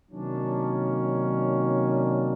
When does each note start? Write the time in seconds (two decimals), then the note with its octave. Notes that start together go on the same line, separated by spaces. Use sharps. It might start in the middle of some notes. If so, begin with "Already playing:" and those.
0.11 C3 D#3 F#3 A#3 C#4 D4
0.95 D4
1.77 D4